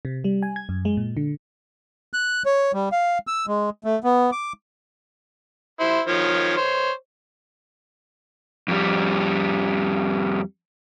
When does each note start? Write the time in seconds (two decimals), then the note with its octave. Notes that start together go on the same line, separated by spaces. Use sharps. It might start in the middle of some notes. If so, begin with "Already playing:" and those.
0.05 C3
0.24 G3
0.43 G#5
0.56 G#6
0.69 F#2
0.85 G#3
0.97 A#2
1.17 D3
2.13 F#6
2.46 C#5
2.74 G3
2.92 F5
3.27 E6
3.47 G#3
3.84 A3
4.04 B3
4.32 D6
5.80 E4 C5
6.08 D#3 F3 C#5
6.57 C5 C#5
8.68 F2 G3